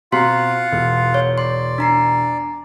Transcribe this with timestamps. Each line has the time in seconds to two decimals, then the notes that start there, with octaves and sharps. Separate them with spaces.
0.12 B2 C4 F4 F5 F#5 A#5 C6 B6
0.72 E1
1.14 C#5
1.38 D5 C6
1.78 D4 A#5 C7